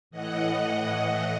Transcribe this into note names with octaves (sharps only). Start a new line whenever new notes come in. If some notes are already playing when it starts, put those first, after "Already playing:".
A2 E3 D#5 F#5